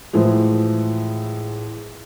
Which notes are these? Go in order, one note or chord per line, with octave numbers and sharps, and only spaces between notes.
A2 E3 F3 G#3